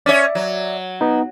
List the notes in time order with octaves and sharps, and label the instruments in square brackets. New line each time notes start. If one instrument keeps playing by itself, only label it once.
[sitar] C#4 C#5 [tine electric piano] D5 E5
[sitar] F#3
[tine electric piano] B3 D#4